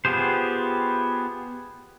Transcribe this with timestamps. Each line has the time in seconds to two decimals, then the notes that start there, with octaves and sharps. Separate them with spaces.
0.05 B3 F4 G4 G#4 C5